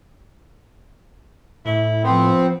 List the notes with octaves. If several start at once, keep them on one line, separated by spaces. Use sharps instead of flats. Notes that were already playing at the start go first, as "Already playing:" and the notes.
A2 E4
F3 B3 C4